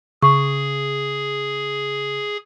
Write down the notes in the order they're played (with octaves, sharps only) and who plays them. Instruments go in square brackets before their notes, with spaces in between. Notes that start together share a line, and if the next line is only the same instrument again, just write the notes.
[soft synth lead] C#3 [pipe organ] G#4 [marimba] C#6